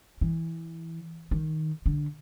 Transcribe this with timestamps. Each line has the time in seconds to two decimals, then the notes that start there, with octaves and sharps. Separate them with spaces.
0.21 E3
1.31 D#3
1.86 D3